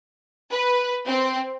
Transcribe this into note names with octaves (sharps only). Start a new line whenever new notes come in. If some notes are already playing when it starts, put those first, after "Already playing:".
B4
C4